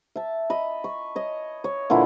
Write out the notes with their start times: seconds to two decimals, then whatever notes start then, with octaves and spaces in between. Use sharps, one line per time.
0.16 E5 A5
0.50 D#5 B5
0.84 C#6
1.16 C#5 D#5
1.64 C#5
1.90 A#2 D3 E3 E4